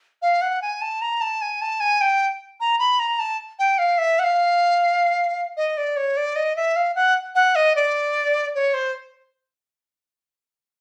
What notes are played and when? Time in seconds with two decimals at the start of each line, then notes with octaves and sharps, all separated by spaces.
0.22 F5
0.42 F#5
0.62 G#5
0.81 A5
1.02 A#5
1.21 A5
1.42 G#5
1.61 A5
1.80 G#5
2.01 G5
2.60 A#5
2.79 B5
2.99 A#5
3.19 A5
3.59 G5
3.78 F5
3.98 E5
4.19 F#5
4.24 F5
5.57 D#5
5.77 D5
5.97 C#5
6.17 D5
6.36 D#5
6.56 E5
6.76 F5
6.95 F#5
7.35 F#5
7.56 D#5
7.76 D5
8.55 C#5
8.74 C5